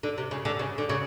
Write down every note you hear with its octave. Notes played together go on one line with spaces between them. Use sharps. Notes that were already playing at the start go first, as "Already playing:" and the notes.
D3
C3
C#3
D3
C#3
D3
C#3